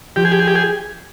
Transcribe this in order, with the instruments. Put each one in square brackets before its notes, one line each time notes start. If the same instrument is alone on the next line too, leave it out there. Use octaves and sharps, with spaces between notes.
[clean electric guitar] F3 [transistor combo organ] G4
[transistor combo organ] G#4
G4
G#4
G4
G#4